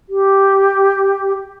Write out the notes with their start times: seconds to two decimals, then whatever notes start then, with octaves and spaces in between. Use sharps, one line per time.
0.09 G4